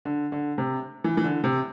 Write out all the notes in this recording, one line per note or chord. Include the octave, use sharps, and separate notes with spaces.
D3
D3
C3
E3
E3
D3
C3